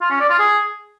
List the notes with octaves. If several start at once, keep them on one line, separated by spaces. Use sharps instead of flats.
F4
C#4
D5
F4
G#4